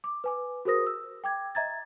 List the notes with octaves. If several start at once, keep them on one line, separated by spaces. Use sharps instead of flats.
D6
B4 G#5 D6
F#4 G#4 A#4 C5 D#6 A#6
E6
G5 D6 G#6
D#5 E5 A#5 G#6 A6